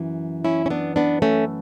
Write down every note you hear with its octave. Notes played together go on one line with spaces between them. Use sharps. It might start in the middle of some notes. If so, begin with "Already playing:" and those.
Already playing: F#2 E3
C#4 E4
C#4
B3 D4
B3 D4
A3 C#4